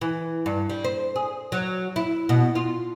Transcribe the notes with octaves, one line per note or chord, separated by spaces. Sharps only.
E3
G2
G3
C5
G#4
F#3
E4
B2
F4